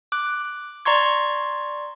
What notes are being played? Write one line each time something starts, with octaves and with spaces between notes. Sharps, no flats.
D6 F#6
D5 A#5 C6 C#6 G#6